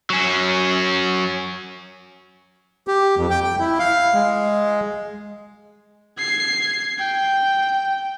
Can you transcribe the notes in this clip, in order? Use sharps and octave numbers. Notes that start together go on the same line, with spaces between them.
F#3 C#4
G4
F2
G5
G5
E4
F5
G#3
G#6 C7
G5